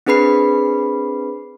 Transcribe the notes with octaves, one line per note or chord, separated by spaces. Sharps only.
C4 D4 G#4 B4 B5 C7